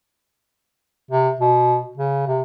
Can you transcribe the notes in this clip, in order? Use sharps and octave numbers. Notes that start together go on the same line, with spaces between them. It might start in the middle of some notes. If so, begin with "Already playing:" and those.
C3
B2
C#3
C3